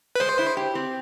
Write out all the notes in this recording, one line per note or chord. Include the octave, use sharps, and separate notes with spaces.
B4
G#3 C5
E4
G4
C4